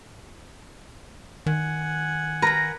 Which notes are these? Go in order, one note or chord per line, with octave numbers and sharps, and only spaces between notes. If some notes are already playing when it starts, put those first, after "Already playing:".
D#3 F#5 G#5
A#4 B4 A#5